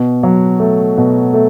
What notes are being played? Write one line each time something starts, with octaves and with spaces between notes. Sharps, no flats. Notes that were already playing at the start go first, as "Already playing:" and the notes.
Already playing: B2
F#3
A3
B2
A3